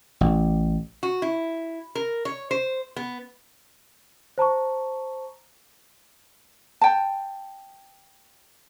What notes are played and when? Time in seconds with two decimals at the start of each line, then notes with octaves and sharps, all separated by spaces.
0.21 A1
1.03 F#4
1.22 E4
1.95 A#4
2.25 C#5
2.51 C5
2.96 B3
4.38 C5 A5 A#5 C#6
6.81 G5 A5